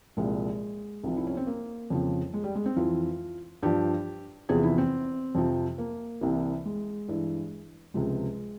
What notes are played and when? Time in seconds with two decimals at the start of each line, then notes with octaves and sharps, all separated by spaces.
0.17 C2 A#2 F3 G#3
1.03 C2 C3 F3
1.17 E4
1.27 C#4
1.37 C4
1.47 A#3
1.90 F2 C#3 F3
2.34 G#3
2.44 G3
2.55 G#3
2.66 C4
2.76 F2 E3 F4
3.63 G2 F3 G4
4.49 E2 C3 F3 G#4
4.63 E4
4.78 C4
5.35 F2 C3 F3
5.78 A#3
6.21 C2 C3 E3
6.65 G#3
7.08 G2 E3
7.94 C#2 C3 F3 G#3